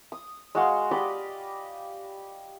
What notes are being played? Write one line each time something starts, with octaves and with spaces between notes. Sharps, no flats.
D#6
G#3 F#4 F5 C6
G4 D5 D#5 B5